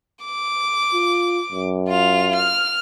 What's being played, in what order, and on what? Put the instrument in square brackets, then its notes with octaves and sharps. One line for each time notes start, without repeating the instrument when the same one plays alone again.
[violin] D6
[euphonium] F4
F#2
[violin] F4 F7
F6